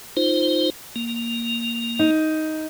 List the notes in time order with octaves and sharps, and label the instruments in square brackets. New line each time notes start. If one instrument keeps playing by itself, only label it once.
[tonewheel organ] D#4 F4 C5
A#3
[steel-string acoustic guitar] D#4